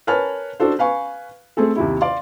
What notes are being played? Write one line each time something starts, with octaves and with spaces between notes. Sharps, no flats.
A#4 B4 C#5 G#5 A5 F6
D4 F#4 A4 C5
B4 F5 G#5 C#6
A3 C4 G#4 A4
D#2 C3 E4
D5 F5 C6